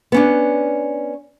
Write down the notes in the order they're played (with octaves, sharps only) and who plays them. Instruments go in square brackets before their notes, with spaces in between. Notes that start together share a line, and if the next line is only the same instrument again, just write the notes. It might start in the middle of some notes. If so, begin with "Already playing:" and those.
[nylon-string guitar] B3 C#4 D4